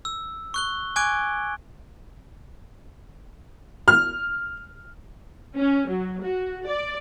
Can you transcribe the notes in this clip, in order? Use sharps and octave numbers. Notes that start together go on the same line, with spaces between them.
E6
C#6 F#6 G7
G#5 C#6 D6 F#6 G#6 D7
F6
C#4
F#3
F#4
D5